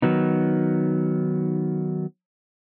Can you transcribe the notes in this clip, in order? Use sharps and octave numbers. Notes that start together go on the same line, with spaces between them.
D#3 F#3 B3 D#4